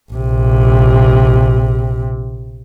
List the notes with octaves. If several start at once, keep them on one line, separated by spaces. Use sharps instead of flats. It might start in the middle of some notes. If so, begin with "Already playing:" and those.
A#1 C3